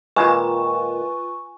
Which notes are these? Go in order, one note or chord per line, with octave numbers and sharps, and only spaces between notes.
A#2 D#3 G#3 F4 B4 G#5 C#6